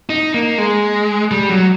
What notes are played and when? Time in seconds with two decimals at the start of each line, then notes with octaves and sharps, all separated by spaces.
0.10 D#4
0.34 A#3
0.58 G#3
1.31 G3
1.50 F#3